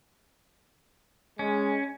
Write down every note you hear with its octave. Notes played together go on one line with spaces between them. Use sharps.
G#3 C#4